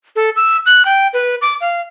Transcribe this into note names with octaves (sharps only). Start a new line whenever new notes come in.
A4
E6
F#6
G5
B4
D6
F5